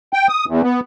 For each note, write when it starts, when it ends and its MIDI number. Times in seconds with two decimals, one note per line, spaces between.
0.13 0.27 79
0.29 0.45 87
0.47 0.62 40
0.63 0.80 59